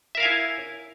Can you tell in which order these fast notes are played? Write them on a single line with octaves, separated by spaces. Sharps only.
E5 A#4 F5 G#5 E4